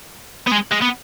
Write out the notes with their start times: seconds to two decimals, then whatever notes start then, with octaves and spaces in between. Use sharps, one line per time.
0.47 B3
0.52 G#3
0.72 G#3
0.82 B3